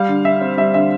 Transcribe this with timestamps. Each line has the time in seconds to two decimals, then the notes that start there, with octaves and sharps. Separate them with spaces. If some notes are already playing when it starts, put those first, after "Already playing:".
Already playing: G3 F5
0.09 D3
0.25 D3 E5
0.41 C4
0.57 G3 E5
0.74 D3 E5